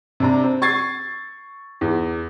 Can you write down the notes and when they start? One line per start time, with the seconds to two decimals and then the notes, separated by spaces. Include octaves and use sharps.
0.20 C3 D4 A#5
0.44 C4
0.62 C#6 G#6 A6 C7
1.81 E2